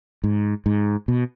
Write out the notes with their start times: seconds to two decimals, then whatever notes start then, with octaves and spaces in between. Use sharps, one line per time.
0.24 G#2
0.66 G#2
1.08 B2